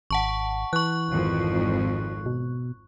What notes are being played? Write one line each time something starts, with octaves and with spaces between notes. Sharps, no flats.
G#1 F#5 A5 C#6
E3 C#6 F#6
G#1 F2
B2